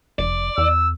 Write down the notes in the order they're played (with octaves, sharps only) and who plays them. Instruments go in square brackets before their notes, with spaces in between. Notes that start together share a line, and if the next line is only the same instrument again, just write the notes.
[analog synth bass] F1 [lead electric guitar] D5
[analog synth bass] E2 [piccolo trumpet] E6